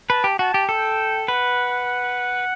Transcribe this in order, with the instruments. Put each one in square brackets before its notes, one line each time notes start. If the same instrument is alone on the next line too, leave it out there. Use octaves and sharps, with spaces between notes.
[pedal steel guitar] B4 [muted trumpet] A5
[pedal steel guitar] G4
[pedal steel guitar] F#4 [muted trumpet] A5
[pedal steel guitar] G4
[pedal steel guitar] A4 [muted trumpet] G5
[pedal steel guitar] B4 [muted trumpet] F#5